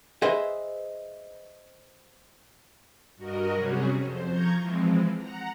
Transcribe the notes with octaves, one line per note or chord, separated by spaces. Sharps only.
G#4 B4 C5 D#5 E5
G2 F#4 A#4 D#5
C3 F#3 G3 C#4 F#4 G#4
F2 C5
F3 A#5 C#6 G6 G#6
E3 F3 G#3 C4
F#5 A#5